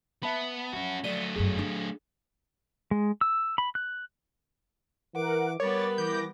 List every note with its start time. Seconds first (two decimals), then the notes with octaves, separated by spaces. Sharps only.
0.23 B3 E5 A5 B5
0.73 F3 C#4 F#4
1.04 F#3 A3 D5 D#7 G7
1.36 G1 F#2 G#4
1.59 D4
2.91 G#3
3.21 E6
3.58 B5
3.75 F#6
5.15 E3 A#4 F#5 D6
5.60 G3 B3 A#4 B4 C#5 D6 A6
5.98 E3 D6 G6 A#6